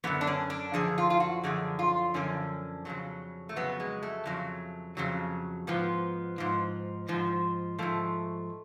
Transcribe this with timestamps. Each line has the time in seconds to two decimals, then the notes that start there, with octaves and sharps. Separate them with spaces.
0.04 F#2 D3 F3 B3
0.21 D4
0.27 C#4
0.50 D4
0.74 F#2 D3 F3 G#4
0.98 F4
1.10 F4
1.20 F#4
1.44 F#2 D3 F3 G#4
1.79 F4
2.14 F#2 D3 F3 C#4
2.85 F2 C#3 F#3
3.49 A3
3.56 F2 C#3 F#3 B3
3.80 G#3
4.03 A3
4.26 F2 C#3 F#3
4.97 F2 C#3 F#3
5.67 G#2 F3 B3
6.38 G#2 F3
7.08 G#2 F3
7.79 G#2 F3 A3